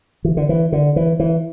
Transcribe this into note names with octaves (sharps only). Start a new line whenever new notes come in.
E3
D3
E3
D3
E3
E3